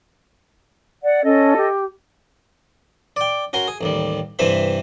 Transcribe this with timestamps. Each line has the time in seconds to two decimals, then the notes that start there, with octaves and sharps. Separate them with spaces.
1.02 D5 F#5
1.24 C#4 A4 D#5
1.57 G4
3.16 D5 G5
3.53 C#4 F#4 A#4 C6
3.68 G#4
3.81 A1 D#2 G3
4.39 G2 C3 E3 C5 E5 B5